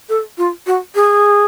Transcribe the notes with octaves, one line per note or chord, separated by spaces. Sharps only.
A4
F4
F#4
G#4